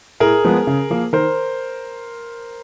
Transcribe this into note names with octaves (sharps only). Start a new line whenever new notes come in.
A2 G#4 A#4
F3 G#3 B3
C#3
F3 A#3
D#3 A#4 C5